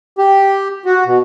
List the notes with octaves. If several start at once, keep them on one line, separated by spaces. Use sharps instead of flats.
G4
F#4
B2